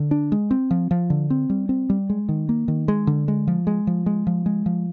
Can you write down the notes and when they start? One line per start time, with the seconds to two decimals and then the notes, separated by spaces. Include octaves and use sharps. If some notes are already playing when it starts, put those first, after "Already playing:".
Already playing: D3
0.11 D4
0.32 G#3
0.51 C4
0.71 F3
0.91 F3
1.10 D3
1.30 C4
1.50 G3
1.69 C4
1.90 G3
2.10 G#3
2.29 D#3
2.49 A#3
2.68 D#3
2.88 G#3
3.07 D3
3.28 G#3
3.47 F3
3.67 G#3
3.87 F3
4.06 G#3
4.27 F3
4.46 G#3
4.66 F3